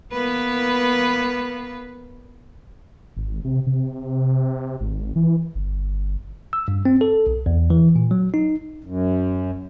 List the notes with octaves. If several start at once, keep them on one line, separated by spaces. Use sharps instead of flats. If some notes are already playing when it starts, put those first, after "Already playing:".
A#3 B3 B4
G#1
C3
C3
G#1
E3
G1
E6
G2
C4
A4
B1
E2
E3
A#2
F#3
D#4
F#2